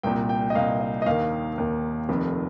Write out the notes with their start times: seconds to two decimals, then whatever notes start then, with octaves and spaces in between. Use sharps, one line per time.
0.03 C2 A#2 G5
0.29 G5
0.50 D#5
0.55 C2 F5
0.59 A#2
0.81 D#5
1.02 D#5
1.06 D#2 D#3 F5
1.58 D#2 D#3
2.09 F1 F2 D#3